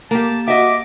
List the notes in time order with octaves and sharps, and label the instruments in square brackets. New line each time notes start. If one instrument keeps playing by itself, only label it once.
[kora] A#3 G4 [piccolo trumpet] A5
[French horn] F#4 [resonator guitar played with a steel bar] D#5 E5 [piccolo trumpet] D6